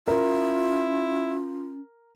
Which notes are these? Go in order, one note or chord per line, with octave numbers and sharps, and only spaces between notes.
C#4 E4 F4 A#4